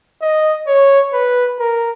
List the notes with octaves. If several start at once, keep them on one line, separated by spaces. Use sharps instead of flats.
D#5
C#5
B4
A#4